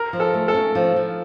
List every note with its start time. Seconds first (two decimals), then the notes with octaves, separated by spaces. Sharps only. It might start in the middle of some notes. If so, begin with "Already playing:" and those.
Already playing: A#4
0.13 F3
0.20 A4
0.34 A3
0.48 A4
0.54 C#4
0.75 F3
0.96 F3